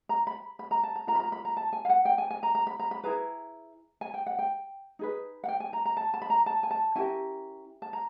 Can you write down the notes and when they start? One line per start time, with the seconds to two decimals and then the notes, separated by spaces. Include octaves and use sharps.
0.09 A#5
0.27 B5
0.59 B5
0.71 A#5
0.83 A5
0.96 A#5
1.07 F4 A#4 A#5
1.15 B5
1.20 A#5
1.32 B5
1.45 A#5
1.57 A5
1.73 G#5
1.85 F5
1.89 F#5
2.05 G5
2.18 G#5
2.30 G#5
2.43 A#5
2.55 A#5
2.67 B5
2.79 A#5
2.91 B5
3.04 E4 G#4 B4 A#5
4.01 G#5
4.14 G5
4.26 F#5
4.39 G5
4.99 D#4 G#4 B4
5.44 F#5
5.48 G5
5.60 G#5
5.73 A#5
5.85 A#5
5.97 A5
6.14 A5
6.22 B5
6.30 A#5
6.46 A5
6.63 G#5
6.71 A5
6.96 C#4 E4 G4 A#4 G#5
7.82 A5
7.93 A#5